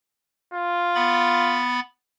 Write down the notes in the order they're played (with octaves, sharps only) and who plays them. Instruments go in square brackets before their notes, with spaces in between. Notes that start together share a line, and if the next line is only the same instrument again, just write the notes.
[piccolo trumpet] F4
[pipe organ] B3 B5 A6